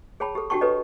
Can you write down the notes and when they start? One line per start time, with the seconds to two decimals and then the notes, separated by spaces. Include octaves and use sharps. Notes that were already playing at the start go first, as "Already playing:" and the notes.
0.20 G#4 C#5 G5 A5 B5
0.35 G4 A4
0.50 D4 F#4 G4 G5 A5 C#6
0.61 G4 A4 B4 C#5 D#5